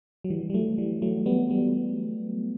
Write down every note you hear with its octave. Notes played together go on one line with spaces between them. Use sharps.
F#3
E3 G3
G3
F#3 A3
E3 G3
F#3 A3
G3 B3
G3 B3